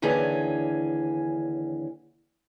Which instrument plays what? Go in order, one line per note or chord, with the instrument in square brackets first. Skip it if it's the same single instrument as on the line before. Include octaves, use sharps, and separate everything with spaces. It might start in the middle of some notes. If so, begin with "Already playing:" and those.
[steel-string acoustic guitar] D#2 D3 E3 C#4 G#4